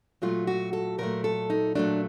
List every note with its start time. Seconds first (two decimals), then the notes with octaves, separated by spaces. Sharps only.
0.22 A#2 F#3 A3 F4
0.47 F#4
0.73 A4
0.98 A#2 F#3 A3 A#4
1.24 A4
1.50 D#4
1.75 A#2 F#3 A3 D4